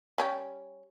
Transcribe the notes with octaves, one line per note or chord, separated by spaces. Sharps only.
G3 C#4 G4